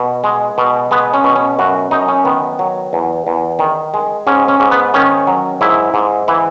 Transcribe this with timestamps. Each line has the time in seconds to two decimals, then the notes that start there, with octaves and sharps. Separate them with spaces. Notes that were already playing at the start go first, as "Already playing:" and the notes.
Already playing: B2
0.24 G#3
0.58 B2
0.91 G#3 B3
1.14 C#4
1.24 B2
1.36 C#4
1.59 F#2 F#4
1.91 F#2 D#4
2.08 C#4
2.25 D#3 B3
2.59 F#3
2.93 E2
3.27 E2
3.59 D#3
3.94 G#3
4.27 G#2 C#4
4.48 C#4
4.60 G#2
4.71 B3
4.94 D#3 C#4
5.27 F#3
5.61 G#2 E4
5.94 G#2
6.28 E3 E4